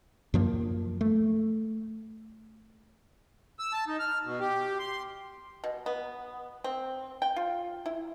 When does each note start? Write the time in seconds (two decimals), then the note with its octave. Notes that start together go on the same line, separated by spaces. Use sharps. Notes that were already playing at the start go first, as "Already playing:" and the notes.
0.34 F#2 F3 A#3
1.01 A3
3.59 E6
3.73 A5
3.88 D#4
3.99 F6
4.25 B2
4.40 G4
4.79 C6
5.64 B2
5.86 B3
6.64 C4
7.22 G5
7.36 F4
7.86 E4